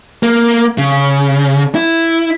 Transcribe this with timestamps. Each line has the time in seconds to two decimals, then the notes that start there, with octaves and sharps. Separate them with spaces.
0.23 A#3
0.78 C#3
1.75 E4